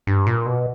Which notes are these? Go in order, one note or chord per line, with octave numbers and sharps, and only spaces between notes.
G2
A#2
B2